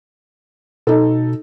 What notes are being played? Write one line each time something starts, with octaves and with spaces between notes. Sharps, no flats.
B2 D#4 A4